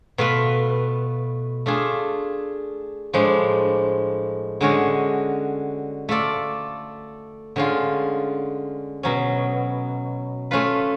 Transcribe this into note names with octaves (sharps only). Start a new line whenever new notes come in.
B2 A3 F4 B4
A3 D4 F4 G#4
A2 F3 G#3 D4
D3 G#3 C#4 F#4 C#5
A3 F4 A4 D5
D3 G#3 C#4 F4
B2 F#3 C#4
A3 C#4 F4 B4